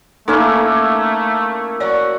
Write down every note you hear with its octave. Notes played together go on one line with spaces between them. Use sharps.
A3 A#3 C#4 D#4 E4 A4
F#4 C#5 D5